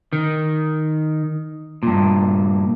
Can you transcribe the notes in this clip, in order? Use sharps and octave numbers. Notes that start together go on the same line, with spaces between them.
D#3
G2 A#2